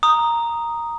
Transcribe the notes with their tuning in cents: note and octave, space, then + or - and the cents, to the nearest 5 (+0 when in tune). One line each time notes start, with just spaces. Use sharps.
A#5 +0 D#6 +0